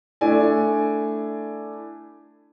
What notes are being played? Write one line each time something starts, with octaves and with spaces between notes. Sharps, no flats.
A3 D4 E4 D5 G#5